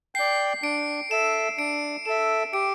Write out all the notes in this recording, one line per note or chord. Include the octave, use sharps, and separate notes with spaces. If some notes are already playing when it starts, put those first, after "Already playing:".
D5 G5 C7
D4 D7
A4 E5 E7
D4 D7
A4 E5 E7
G4 D7